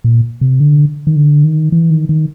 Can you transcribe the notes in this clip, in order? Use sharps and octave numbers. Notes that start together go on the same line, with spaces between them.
A#2
C3
D3
D#3
D3
D#3
E3
D#3
D#3